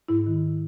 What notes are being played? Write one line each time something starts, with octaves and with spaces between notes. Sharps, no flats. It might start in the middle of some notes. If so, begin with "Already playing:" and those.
G#2 E4
D#3